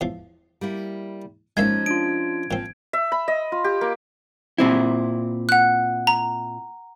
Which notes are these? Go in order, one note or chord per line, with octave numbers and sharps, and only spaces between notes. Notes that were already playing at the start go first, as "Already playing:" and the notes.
E2 F3
G3 A#3 E4
F3 G#3 A#3 C#4 D#4 E5 G#6
D4 F4 D7
A#2 F3 C4
E5
B5
D#5
F4
G4
A#3
A#2 C4 E4
F#5 F#6
A#5